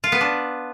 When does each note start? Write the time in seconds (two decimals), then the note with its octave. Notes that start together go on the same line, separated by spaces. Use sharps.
0.04 F4
0.12 B3
0.21 D4